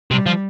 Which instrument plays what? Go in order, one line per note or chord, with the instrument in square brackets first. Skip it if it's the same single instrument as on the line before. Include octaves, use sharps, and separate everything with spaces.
[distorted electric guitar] C3 [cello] G3
[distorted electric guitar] F3